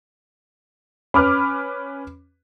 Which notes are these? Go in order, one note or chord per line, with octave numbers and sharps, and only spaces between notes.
C#4 B4 B5 D6 F6